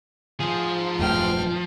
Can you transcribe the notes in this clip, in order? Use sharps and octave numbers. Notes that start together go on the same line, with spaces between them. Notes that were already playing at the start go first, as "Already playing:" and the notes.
F3 G#4 C5
D#1 F#2 A3 G5 F6